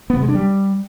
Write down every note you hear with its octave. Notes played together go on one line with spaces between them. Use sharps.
B3
C3
G#3
D4
G3